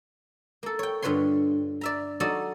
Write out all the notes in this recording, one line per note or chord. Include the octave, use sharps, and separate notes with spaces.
A#3 A4
C#5 G5
G2 D3 F4 B4 C#5 C6
D5 E5 A#5
F#3 D#4 F#4 A4 C#5 D5